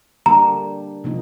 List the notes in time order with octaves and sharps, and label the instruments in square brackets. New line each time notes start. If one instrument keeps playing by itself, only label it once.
[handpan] D3 G3 A#3 D4 G4 [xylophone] A#5
[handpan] C3 F3 A#3 D#4